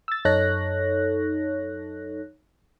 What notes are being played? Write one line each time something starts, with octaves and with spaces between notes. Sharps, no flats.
E6 A6
F#2 D#4 A4 C#5 F#6 A#6